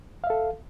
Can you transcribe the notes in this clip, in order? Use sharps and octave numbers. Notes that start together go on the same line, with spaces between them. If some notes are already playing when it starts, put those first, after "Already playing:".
A4 E5 F5